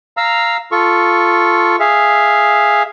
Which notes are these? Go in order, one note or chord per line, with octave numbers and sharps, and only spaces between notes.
F5 A#5 E6
F4 A4 C#6
G#4 E5 F5